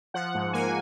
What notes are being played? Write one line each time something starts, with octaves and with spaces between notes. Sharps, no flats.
F3 F#5
G#2
A#3 G#5